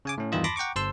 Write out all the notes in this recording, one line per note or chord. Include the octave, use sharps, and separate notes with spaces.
C#3 G#5 D6
A2 C#4
E2 G2 D#3 E3 F4 D#5
A5 B5 C6 D6 A#6
F#5 G5 A#5 C#6 D6
G1 C5 A5 C6 E6